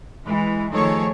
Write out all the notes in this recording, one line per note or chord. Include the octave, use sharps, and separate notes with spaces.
E3 G#3
D#3 F3 A3 G#4 A4 C#5